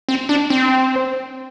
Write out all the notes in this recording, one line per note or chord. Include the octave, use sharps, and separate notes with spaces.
C4
D4
C4